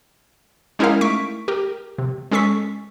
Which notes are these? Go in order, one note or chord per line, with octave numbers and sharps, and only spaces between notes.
G#3 C#4 D#4 E4 A#4 F5
A3 C#6 B6 D7
G4 A#4
C3
G#3 C#4 A4 C#6 B6